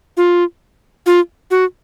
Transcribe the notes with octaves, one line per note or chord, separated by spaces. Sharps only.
F4
F4
F#4